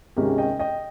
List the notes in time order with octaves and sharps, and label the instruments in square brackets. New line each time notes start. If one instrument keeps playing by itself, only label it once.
[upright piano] C#2 C3 D#3 G#3 C#4 G4 A#4
D#5 G5
D#5 G5